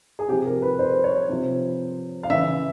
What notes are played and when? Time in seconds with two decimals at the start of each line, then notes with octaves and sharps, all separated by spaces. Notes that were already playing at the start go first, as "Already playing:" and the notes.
0.19 G#4
0.28 C3 G4
0.32 F3
0.46 A#4
0.62 B4
0.79 C5
1.04 C#5
1.29 C3 F3
2.23 F5
2.30 C#3 E3 E5